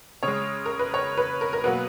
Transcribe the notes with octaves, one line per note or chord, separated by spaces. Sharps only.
C#3 G#3 C#5
A#4
B4
C#5
B4
A#4
A#4
B2 F#3 A#3 B4